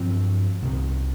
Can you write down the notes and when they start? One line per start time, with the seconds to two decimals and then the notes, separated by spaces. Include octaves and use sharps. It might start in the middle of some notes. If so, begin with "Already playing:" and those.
Already playing: G2 F3 C4
0.62 C2 C3 D#3